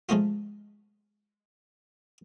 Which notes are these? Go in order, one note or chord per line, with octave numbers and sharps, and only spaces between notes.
F3 G#3 A3 D#4 F4